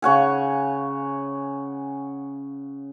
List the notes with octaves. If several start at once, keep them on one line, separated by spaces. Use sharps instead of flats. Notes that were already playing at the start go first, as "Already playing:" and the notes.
C#3 C#5 F#5 G#5